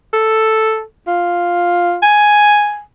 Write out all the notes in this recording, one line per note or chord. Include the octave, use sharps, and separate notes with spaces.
A4
F4
G#5